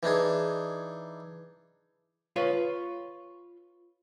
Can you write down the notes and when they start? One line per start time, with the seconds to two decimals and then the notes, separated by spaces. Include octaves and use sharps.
0.03 E3 D4 D#4 G#4
2.36 F4 B4 C#5